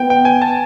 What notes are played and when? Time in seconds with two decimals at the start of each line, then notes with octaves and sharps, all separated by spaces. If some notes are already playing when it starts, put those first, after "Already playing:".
Already playing: B3 G5
0.10 G5
0.25 G#5
0.42 A5